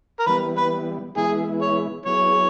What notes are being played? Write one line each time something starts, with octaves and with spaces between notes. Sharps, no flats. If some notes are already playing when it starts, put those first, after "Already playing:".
A#4
E3 G3 B3 B4
B4
E3 G#3 B3 E4 G#4
C#5
F#3 B3 E4 G#4 C#5